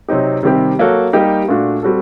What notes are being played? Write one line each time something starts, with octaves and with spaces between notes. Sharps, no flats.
C3 F#3 C4 D#4 G4
C3 D#3 G3 C4 G4
F#3 A#3 F#4 A4
G3 A#3 D#4 G4
A#2 A3 D4 F#4
G3 C4 F#4 A4